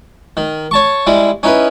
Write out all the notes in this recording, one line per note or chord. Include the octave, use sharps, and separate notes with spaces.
D#3
C#5 A5 C#6
G3 G#3 E4
C#4 D#4 E4 B4